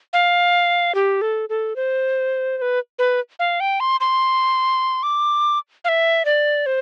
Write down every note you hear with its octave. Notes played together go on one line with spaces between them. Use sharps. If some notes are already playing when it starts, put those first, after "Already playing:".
F5
G4
A4
A4
C5
C5
B4
B4
F5
G5
C6
C6
D6
F5
E5
D5
C5